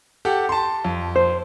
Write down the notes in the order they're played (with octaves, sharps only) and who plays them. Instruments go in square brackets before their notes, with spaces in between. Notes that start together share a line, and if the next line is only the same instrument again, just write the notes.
[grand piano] G4 A4 F#5
A5 C6
F2
[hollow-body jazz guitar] C5